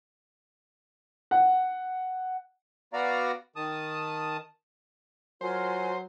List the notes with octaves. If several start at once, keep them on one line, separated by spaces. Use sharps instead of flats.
F#5
B3 F#4 D5 F5 A#5
D#3 A5 D#6
F#3 F4 A#4 C5 G#5